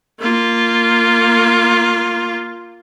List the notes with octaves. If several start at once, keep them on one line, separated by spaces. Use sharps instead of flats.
A#3 F4